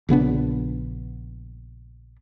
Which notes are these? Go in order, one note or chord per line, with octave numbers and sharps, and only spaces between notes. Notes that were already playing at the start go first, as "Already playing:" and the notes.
A#1 C#3 B3 D4